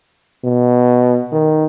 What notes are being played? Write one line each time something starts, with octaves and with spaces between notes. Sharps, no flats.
B2
D#3